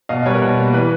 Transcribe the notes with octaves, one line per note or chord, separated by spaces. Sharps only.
B2 D#5 F5
G3 B4 C#5
A#4
B2
A#3
E3 B4